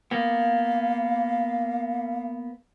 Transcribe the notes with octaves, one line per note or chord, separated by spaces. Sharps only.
A#3 B3 F5